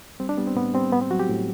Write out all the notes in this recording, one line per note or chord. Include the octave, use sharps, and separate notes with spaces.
G3 C4
D4
G3 B3
C4
A2 B3
G3 C4
A2 B3
C4
F#3 F#4
G4
A2